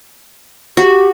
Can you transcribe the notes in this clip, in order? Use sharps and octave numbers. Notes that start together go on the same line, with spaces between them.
F#4 G4